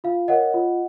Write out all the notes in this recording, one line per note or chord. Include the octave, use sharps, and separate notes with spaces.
F4 F5
A#4 C#5 D#5 F#5
F4